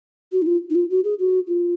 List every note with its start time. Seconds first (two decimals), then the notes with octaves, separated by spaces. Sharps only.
0.32 F#4
0.42 D#4
0.47 F4
0.70 D#4
0.75 F4
0.90 F#4
1.04 G#4
1.20 F#4
1.47 F4